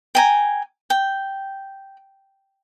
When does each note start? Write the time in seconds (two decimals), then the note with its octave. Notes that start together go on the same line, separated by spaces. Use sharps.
0.15 G5 G#5 A#5
0.90 G5